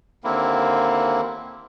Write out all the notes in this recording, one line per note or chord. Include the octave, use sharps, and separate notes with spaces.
D#2 D3 A#3 C4 E4